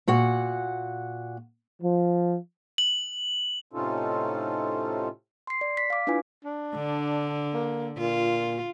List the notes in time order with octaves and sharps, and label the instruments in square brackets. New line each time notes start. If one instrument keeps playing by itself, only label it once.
[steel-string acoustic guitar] A#2 F#4 F#5
[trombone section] F3
[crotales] F#7
[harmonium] A2 C3 C#4 D#4 F4 A4
[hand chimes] C6 C7
D5
B6
F5 D6
D4 E4 F4 B4 G#5
[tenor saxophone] D4
[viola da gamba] D3
[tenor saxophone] A#3
[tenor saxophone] A#2 [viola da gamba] F4